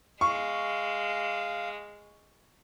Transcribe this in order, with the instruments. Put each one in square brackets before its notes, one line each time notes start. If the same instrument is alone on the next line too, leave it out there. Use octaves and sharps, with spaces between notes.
[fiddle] G#3 [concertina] F5 [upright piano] C#6